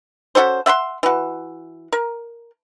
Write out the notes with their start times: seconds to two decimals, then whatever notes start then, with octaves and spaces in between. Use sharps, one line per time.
0.35 C#4 F#4 A4 C5
0.66 E5 F#5 B5 C6
1.03 E3 F#4
1.93 A#4